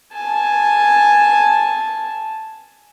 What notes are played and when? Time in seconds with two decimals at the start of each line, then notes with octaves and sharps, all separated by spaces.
0.14 G#5 A5